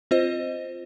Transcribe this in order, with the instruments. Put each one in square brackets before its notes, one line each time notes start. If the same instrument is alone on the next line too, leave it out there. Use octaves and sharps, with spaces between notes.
[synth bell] C4 F4 C5 D#5